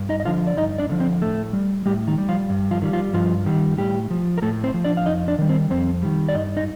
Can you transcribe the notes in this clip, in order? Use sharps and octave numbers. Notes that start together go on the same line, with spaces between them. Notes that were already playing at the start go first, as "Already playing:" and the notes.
Already playing: G2
D#4 D#5
D#5
D3 F3 F4 F5
D5
G2 D#4 D#5
D4 D5
D3 F3
C4 C5
A2 A3 A4
G3
A2 G3 G4
D#3 D#4
G3
F3 F4
G2
F3 F4
D#3 G3
F3 F4
G2 F3 F4
D#3 G3
A2 G3 G4
F3
A#4
A2 A3 A4
C4 C5
F3
D4 D5
F5
F2 D#4 D#5
D4 D5
D#3 G3
C4 C5
F2 C4 C5
D#3 G3
D5
G2 D#4 D#5
D#4 D#5